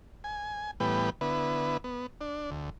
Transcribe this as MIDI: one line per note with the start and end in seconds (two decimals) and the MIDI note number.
0.24 0.71 80
0.80 1.10 45
0.80 1.10 52
0.80 1.10 55
0.80 1.10 59
0.80 1.10 71
0.80 1.10 79
1.21 1.77 50
1.21 1.77 59
1.21 1.77 64
1.21 1.77 71
1.84 2.07 59
2.21 2.50 62
2.51 2.70 38